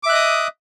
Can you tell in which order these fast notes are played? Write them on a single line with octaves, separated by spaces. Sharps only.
D6 E5 F#6 D#5 D#6